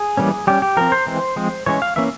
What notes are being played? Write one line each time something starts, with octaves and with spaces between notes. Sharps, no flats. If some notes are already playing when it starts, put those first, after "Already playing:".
Already playing: G#4
E3 G3 A#3 C#4
G3 C#4 G4
G4
F3 C4 A#4
C5
E3 G#3 C4
F3 G#3 C4
E3 G#3 C#4 C#5
F5
E3 A#3 C#4 E5